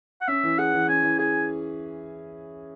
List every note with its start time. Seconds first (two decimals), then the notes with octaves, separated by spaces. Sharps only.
0.21 F#5
0.28 C#4 E5
0.43 E3
0.59 G#4 F#5
0.74 E3
0.88 C#4 G#5
1.03 E3
1.19 G#4 G#5